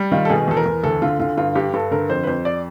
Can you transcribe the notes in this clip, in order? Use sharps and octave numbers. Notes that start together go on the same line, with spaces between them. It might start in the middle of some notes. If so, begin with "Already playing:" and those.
Already playing: G3
D#3 F4
A4
B2 G#4
E2 A4
A#4
E2
D2 A4
D3 F4
D3 F4
G2 F4
G2 G4
G2 A4
D3 A#4
F2 C5
B4
F2 C5
D5